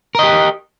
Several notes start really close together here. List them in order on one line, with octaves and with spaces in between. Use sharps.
A#4 D#5 G4